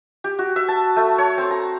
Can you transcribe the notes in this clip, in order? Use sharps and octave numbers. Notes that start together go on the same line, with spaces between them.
G4
F#4
E5
A5
A3
C#5
C4
A#5